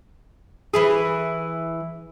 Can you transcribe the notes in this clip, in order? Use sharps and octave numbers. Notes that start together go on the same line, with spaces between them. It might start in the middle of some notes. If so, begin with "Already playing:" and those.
E3 E4 G#4